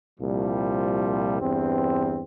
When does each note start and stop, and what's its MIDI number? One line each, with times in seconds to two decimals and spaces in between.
0.20 1.40 36
0.20 1.40 46
0.20 1.40 53
0.20 1.40 55
1.41 2.24 40
1.41 2.24 43
1.41 2.24 60